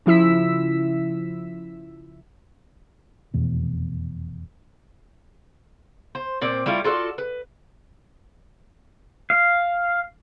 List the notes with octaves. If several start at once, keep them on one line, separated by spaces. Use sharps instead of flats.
C#3 F3 E4 E6 B6
F1 E2 B2
C5
A#2 C4 D5
G3 A3 E4 F4
F4 F#4 A4 D5
B4
F5